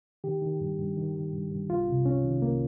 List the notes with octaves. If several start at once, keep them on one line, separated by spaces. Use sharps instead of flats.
D#3 G4
D#3
G2
G2
D#3
D#3
G2
G2
C2 F4
C3
C2 C#4
D#3
C2 A#3